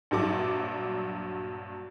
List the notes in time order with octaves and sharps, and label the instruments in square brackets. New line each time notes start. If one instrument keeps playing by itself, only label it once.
[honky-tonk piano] A#1 G2 F#3 D6